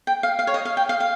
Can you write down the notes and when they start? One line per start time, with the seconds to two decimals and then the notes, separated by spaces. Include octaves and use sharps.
0.07 G5
0.23 F5
0.39 F5
0.47 C#5
0.54 D#5
0.65 F5
0.77 G5
0.89 F5
1.00 F5